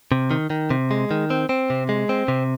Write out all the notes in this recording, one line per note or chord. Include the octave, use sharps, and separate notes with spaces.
C3
D#3
D#3
C3
G#3
D#3
C4
C4
C3
G#3
C4
C3